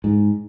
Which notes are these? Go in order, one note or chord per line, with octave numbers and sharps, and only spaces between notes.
G#2